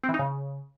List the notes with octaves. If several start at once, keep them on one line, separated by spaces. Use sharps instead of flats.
C4
E3
D#4
C#3